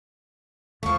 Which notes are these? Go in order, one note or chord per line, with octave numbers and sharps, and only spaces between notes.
E2 F3 A3 C#6